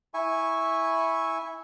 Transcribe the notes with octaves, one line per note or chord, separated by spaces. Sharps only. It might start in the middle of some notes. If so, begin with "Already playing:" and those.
E4 E5 G#5 C#6